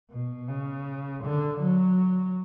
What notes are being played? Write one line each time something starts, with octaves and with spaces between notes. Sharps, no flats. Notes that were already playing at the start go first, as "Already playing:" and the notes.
B2
C#3
D3
F#3